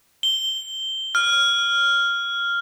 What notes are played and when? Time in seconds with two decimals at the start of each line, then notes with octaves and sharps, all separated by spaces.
0.23 G7
1.15 F6